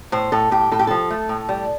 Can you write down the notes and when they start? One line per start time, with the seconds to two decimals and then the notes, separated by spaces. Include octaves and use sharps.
0.12 A2 C5
0.32 A2 A4
0.51 A2 G4
0.71 A2 A4
0.79 G4
0.87 F3 A4
1.10 A3
1.29 A2
1.49 G3